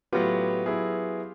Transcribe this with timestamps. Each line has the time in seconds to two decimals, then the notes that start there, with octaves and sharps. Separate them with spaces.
0.12 A2 F#3 B3 F4 G4
0.66 F#3 B3 E4 G#4